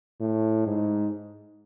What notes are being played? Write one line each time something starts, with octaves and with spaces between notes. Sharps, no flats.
A2
G#2